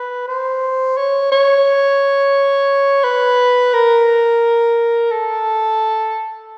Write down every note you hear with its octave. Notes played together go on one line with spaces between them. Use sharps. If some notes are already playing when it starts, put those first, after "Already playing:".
Already playing: B4
C5
C#5
C#5
B4
A#4
A4